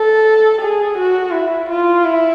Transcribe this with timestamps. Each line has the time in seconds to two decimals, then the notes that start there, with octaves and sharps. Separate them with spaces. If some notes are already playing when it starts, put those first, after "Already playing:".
Already playing: A4
0.61 G#4
0.98 F#4
1.33 E4
1.69 F4
2.04 E4